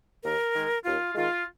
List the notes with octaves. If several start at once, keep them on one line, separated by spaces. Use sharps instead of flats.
D#2 A#4
D#3 G#3
D#2 F4
D#3 G#3 F4